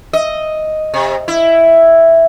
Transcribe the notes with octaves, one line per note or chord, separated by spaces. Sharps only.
D#5
C3
E4